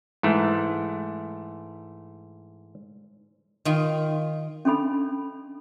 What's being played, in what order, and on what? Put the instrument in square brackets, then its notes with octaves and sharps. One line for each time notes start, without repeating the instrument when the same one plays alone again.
[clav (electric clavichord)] G#2 E3 A3
[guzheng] D#3 F4
[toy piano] C#4 D4 A4 B5